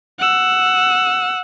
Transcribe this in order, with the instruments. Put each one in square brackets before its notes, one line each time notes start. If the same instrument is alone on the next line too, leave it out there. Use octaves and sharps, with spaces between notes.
[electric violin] F#5 E6